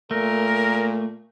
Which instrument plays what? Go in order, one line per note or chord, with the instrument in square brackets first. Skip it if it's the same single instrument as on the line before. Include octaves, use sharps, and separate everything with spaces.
[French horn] A#2 [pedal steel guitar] A3 [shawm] A#4